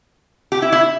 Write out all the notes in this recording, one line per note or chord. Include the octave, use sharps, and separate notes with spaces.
G4
E4
E4